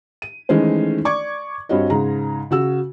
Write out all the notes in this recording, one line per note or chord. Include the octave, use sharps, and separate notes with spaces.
D#7
D#3 E3 G#3 A3 C#4 C5
D5 C#6 D6 G#6
G2 C4 F#4 C#5 D#5
G#2 C#3 A#5
C#3 F#4 E6